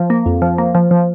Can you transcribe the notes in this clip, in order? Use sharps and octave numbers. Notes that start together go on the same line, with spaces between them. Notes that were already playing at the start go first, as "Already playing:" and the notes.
Already playing: F3
A#3
F2
F3
A#3
F3
F3